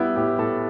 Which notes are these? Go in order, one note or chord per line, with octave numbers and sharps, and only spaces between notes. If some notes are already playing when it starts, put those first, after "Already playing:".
Already playing: G3 B3 E4
A2 G4
A2 A4